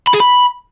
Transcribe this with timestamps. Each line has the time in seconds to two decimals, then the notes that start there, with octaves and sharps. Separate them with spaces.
0.07 B5
0.14 G#4
0.20 B5